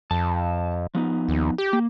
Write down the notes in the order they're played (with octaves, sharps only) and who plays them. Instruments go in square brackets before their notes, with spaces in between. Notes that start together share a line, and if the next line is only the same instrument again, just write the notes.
[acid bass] F2 [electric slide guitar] A5
[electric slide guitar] F3 B3 D#4
[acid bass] D#2
G4
[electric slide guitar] A#3